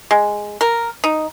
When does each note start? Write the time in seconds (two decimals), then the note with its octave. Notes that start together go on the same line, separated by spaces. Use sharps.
0.11 G#3
0.61 A#4
1.04 D#4